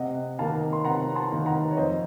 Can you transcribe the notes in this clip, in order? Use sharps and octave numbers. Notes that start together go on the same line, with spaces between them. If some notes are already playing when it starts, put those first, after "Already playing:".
Already playing: C3 D#5 F#5
D#3 A#3 F5 A5
C6
C3 F#5 A#5
A5 C6
D#3 A#3
F#5 A#5
C#5
F2 C5 D#5